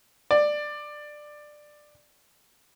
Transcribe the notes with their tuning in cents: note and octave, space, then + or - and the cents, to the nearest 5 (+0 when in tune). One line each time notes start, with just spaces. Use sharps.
D5 +15